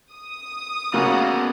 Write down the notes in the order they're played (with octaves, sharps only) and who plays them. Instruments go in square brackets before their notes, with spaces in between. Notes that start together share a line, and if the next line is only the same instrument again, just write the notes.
[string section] D#6
[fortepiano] C#3 C#4 F#4 [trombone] A#3 [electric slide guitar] B3 A4 F#5